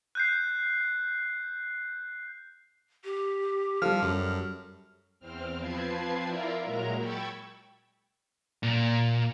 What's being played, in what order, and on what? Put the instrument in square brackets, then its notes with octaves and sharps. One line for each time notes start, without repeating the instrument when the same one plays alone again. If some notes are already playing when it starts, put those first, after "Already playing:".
[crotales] F#6 G6 C7
[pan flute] G4
[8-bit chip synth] F3 [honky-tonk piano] G3 A4 [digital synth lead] F6
[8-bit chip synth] F#2
[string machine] E2 C4 F6
F3 C4 B4 A5 G#6 C7
E4 F4 A#4 D5 E5
A#2 F#3 G#3 A#4 A#5
G5 B5 C#6 E6 G#6 A6
[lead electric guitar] A#2